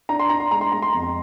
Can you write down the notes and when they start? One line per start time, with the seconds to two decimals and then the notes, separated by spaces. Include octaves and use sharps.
0.09 D4 A#5
0.19 C6
0.30 D4 A#5
0.40 C6
0.51 G#3 A#5
0.61 C6
0.72 G#3 A#5
0.82 C6
0.93 F2 A#5
1.03 C6